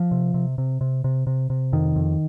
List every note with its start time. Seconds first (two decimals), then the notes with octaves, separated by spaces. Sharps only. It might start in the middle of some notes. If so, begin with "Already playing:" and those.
Already playing: F3
0.11 C3
0.34 C3
0.58 C3
0.81 C3
1.04 C3
1.27 C3
1.50 C3
1.72 F2 D#3
1.96 F2